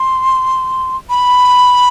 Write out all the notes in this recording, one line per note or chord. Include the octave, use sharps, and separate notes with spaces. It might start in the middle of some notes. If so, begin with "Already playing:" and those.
Already playing: C6
B5